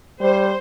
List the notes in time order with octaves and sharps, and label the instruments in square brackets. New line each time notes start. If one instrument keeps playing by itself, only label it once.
[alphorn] G3 [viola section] C5